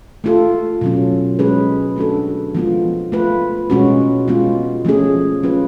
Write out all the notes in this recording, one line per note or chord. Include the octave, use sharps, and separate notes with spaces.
A3 F4 A4
B2 F#3 C#4
G#3 C#4 G#4 B4
A3 D4 F#4 A4
F3 G#3 B3 F4
A3 F4 B4
B2 G#3 C#4 F#4
G#3 B3 F4
F3 A3 C#4 G#4
F#3 C#4 F4 B4